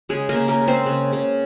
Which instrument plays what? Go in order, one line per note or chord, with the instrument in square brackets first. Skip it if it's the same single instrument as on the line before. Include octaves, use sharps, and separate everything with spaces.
[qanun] C#3 G#3 G#4
A#3 A#4
C#3
A#3 A#4
G#3
C4 C5
C#3
C#3